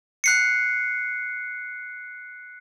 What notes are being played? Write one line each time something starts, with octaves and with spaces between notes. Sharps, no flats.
F#6 C7 C#7